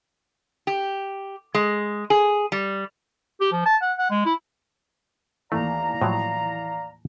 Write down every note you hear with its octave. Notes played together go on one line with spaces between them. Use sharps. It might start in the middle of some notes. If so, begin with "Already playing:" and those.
G4
G#3
G#4
G3
G4
F3
A5
F#5
F#5
G#3
E4
D#2 E3 A3 D5 F5 A#5
A2 F3 F#3